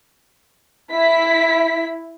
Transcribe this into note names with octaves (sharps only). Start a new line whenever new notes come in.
E4 B6